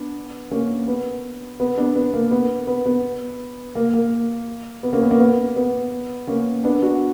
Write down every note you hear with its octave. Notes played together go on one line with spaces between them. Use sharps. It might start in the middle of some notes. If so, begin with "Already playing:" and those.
Already playing: B3 D4
A#3 C#4
B3
B3
B3 D4
B3
A#3
B3
B3
B3
A#3
A#3
B3
A#3 C#4
B3
A#3 C#4
B3
B3
A#3 C#4
B3 D4
D4 F#4